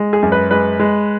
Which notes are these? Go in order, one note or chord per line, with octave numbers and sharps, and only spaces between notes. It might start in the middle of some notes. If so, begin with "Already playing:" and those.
Already playing: G#3
G#4
F#2
B4
G#3 B4
G#3